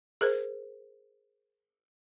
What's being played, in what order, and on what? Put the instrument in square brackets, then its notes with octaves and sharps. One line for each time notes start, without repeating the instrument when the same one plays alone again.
[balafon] G#4 A#4 C5